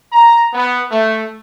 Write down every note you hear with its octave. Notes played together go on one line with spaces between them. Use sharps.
A#5
B3
A3